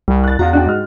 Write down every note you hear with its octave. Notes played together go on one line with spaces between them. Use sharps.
C2 G3
F#6 A6
E2 F#4 F5 A#5
D4 F#4 G5
G#2 F6